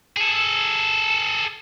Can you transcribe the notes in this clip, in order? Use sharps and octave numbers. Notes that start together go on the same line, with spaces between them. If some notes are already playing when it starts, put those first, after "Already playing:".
G#4 A4